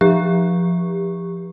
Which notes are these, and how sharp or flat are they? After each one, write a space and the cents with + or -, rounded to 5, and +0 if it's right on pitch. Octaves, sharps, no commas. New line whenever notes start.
F3 +0 G4 +25